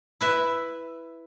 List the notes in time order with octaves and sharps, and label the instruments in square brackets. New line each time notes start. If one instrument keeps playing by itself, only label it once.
[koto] E4 B4 E5